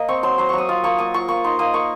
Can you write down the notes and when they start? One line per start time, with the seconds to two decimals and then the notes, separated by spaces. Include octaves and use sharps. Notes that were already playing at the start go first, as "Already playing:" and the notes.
Already playing: A#3 D#5
0.08 C4 C#6
0.23 F#3 C6
0.38 F#3 C6
0.49 F#3 C#6
0.58 D#6
0.69 F4 D#6
0.84 A#3 C#6
0.98 A#3 D#6
1.14 F4 C#6
1.28 A#3 C#6
1.44 D#4 C6
1.59 A#3 D#6
1.74 A#3 C#6